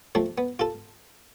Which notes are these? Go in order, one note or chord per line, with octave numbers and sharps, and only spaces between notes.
F3 A3 C4
B3
F4 A4